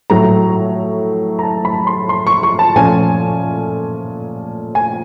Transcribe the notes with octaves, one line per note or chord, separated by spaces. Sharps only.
A2 F#3 A3 A#5
A#5
A5
B5
C6
C6
C#6
C#6
A5
A#2 F3 A3 C#4 G#5
G#5